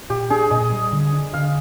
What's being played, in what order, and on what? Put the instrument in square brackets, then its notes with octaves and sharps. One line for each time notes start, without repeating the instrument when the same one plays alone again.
[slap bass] A#2 [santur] G4
[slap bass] D4 [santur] G#4
[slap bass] A#2 [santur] D#5
[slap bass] G3
D3
D4
[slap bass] D3 [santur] F5